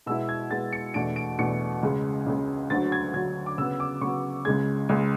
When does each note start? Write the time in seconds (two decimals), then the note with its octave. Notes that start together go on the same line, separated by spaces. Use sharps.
0.06 B2 G#3 B3 E4 E6
0.29 G#6
0.51 B2 G#3 B3 E4 A6
0.73 C#7
0.94 E2 B2 A3 D4 D7
1.16 D7
1.38 E2 B2 A3 D4 C#7
1.83 C#2 C#3 G#3
2.26 C#2 C#3 G#3
2.70 D2 D3 F#3 A6
2.92 G#6
3.14 D2 D3 F#3 G#6
3.46 D6
3.58 C#3 F#3 B3 E6
3.80 D6
4.01 C#3 F#3 B3 C#6
4.45 C#2 C#3 G#3 G#6
4.89 C#2 C#3 G#3